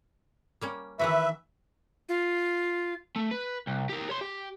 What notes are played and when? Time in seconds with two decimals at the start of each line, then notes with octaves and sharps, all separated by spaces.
0.61 G3 A#3 C#4
0.99 D#3 E3 F#4 B4 E5
2.09 F4
3.16 A3
3.31 B4
3.67 C2
3.89 G4 A#4
4.10 C#5 C6
4.21 G4